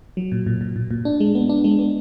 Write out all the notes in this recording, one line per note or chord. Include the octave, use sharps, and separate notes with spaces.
F#3
A#2
A#2
A#2
A#2
A#2
D4
G#3
B3
D4
G#3
B3